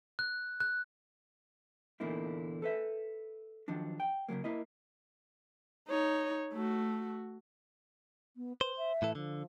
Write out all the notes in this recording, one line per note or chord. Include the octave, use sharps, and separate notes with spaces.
F#6
F#6
E2 A#2 D3 A#3 D#4 E4
A4 B4 E5
D#3 F3 F#3 D4
G5
C#3 F3 F#3 A#3
A#3 E4 D#5
D#4 C#5
A3 F#4
B3
B4 C5
E5
A2 E3 A4
D3 F3